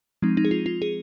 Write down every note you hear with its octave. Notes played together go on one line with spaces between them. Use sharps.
F3 G#3 C4 D#4
D#4
G#4
F4
F4
G#4